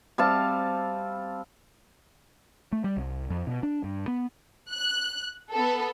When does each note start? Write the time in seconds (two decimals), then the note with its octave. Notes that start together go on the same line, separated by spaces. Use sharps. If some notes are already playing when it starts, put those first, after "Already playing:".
0.18 G3 C4 F5 A5
2.72 A3
2.84 G3
2.97 C2
3.30 F2
3.47 B2
3.63 D4
3.84 G2
4.08 B3
4.71 F#6
5.52 B3 A4